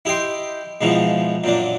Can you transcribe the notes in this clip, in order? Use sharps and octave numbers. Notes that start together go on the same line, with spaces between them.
E4 G4 D#5 G5 C6
G#2 B2 E3 F3
F#2 A#2 D4